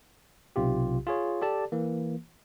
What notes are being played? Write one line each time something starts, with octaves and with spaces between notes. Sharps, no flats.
B1 C3 F4 G4
F4 G#4 C#5
G4 A4 D5 A5
E3 A#3